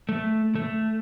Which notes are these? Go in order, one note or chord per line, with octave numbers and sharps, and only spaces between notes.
A3
A3